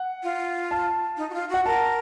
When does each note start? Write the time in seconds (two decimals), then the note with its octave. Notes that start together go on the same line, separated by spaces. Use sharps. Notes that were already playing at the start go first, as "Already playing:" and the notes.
Already playing: F#5
0.23 F4
0.71 A5
1.17 D#4
1.30 F#4
1.34 F4
1.49 F#4 F#5
1.66 A#4 A5